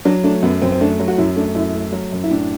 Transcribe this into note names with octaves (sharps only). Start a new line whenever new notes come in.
F#3 D4
A3 D4
F#2 B3
F#2 C4
C4
A3 D4
F#3
F#4
F#2 E4
A3 D4
F#2 E4
A3
F#3
F#2
E4
A2 D4